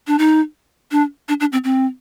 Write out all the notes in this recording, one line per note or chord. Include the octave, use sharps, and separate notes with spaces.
D4
D#4
D4
D4
D4
C4
C4